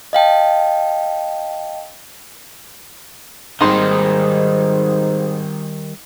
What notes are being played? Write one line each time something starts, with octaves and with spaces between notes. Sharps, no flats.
D#5 F5 G5 A5
G#1 G#2 D#3 G3 D#4 D#5 C6